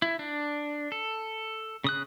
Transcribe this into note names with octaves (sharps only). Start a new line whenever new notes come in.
E4
D4
A4
C#3 D#6 F#6